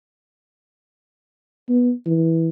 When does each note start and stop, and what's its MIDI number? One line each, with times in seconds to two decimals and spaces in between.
1.68 1.92 59
2.06 2.49 52